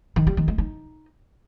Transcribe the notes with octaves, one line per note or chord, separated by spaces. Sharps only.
D#3
G3
D#3
G#3
D#4